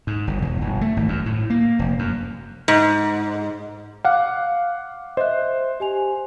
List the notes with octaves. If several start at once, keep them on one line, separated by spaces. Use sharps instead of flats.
G#2
G1
E1
G1
A3
G#1
F#2
A2
A#3
F1
F#2
G#2
F5 F#5 D6
C5 D#5 E5 F#6
G4 G#5 F7